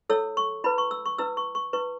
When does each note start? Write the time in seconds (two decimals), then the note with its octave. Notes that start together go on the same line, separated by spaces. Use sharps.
0.09 E4 A4 C#5 E6
0.37 C#6
0.64 E4 B4 B5
0.78 C#6
0.91 E6
1.06 C#6
1.18 E4 B4 E6
1.37 C#6
1.55 C#6
1.73 E4 B4 C#6